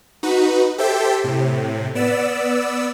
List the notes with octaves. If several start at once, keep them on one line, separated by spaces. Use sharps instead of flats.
D#4 F#4 B4
G4 A4 C5 E5 G5
A2 C3
B3 D5 E6